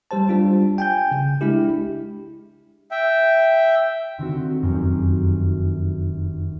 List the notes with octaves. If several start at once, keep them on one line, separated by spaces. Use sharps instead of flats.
G3 G4 C5 A5
G3 D4 F4
G5 G#5 G6
C#3
G#3 D4 E4 G4
E5 G5
D3 D#3 C4 F#4
F1 F#2